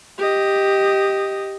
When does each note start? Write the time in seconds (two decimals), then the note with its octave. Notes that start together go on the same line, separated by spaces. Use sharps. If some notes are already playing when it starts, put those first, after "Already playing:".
0.18 G4 D#5